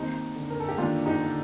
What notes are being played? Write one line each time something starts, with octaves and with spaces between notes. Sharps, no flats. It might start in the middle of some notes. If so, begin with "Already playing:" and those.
Already playing: D#2 C4 D#4
D3
A#4
A4
G4
D#2 D4 F4
D#4 G4
D3